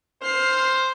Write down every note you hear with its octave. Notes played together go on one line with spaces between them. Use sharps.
C5 F6 C7